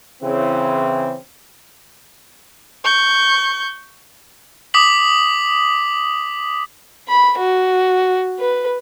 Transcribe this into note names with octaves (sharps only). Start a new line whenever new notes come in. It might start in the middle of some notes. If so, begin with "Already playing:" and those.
C#3 E3 C4
C#6 G6
D6 D#6 B6 F#7
B5
F#4
B4